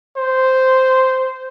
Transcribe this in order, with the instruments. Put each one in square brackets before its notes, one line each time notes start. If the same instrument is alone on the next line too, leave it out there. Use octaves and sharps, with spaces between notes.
[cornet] C5